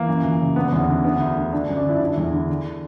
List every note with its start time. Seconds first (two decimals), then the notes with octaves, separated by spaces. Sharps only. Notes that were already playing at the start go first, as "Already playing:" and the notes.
Already playing: E3 A#3
0.08 F#2
0.24 E3
0.40 C#3
0.56 D3 B3
0.68 E2 B3
0.81 C#4
0.89 D3
1.04 D3 B3
1.20 D2
1.36 D3
1.53 D3 D4
1.65 D4
1.69 F#2
1.77 D4
1.85 D3 E4
1.97 D4
2.01 D3 E4
2.17 E2
2.33 D3
2.49 D3